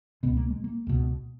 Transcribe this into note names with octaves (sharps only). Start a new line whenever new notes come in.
C#2 B2 B3
A#3
G#3
A#3
C#2 B2